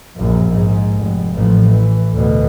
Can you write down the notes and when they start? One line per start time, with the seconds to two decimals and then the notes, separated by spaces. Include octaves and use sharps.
0.16 A#1 F#2
0.51 G#2
0.97 F1
1.34 A1 F3
1.69 E3
2.13 D2 B2